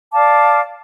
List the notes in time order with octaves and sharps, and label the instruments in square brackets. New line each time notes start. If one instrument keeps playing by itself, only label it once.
[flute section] D5 F5 A5 D6